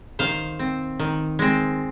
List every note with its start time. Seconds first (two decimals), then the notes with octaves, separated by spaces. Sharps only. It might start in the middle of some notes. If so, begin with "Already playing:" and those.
0.19 D#3 C5 F5
0.59 C4
0.99 D#3
1.39 G#3 C4